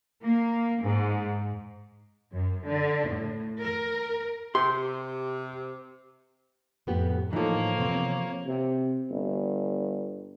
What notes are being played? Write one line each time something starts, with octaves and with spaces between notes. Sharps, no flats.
A#3
G#2
F#2
D3
A2
A#4
C3 G4 C6
F2 A2 B3 G4
E3 F3 A#3 D#4 A4 C#5
C3 B3 C4
C3
G1